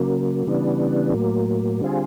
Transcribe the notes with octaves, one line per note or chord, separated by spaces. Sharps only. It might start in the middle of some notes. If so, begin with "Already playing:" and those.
Already playing: C#3 F#3 A#3
C#3 E3 G3 B3 D4
A2 F#3 A#3
D3 G3 C4 F4 G#4